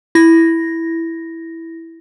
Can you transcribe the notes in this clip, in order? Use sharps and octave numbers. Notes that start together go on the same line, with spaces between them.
E4 A#6